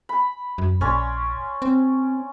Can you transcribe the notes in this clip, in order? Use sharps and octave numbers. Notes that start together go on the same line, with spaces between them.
B5
F#2
A#1 C#4 D5 C6
C4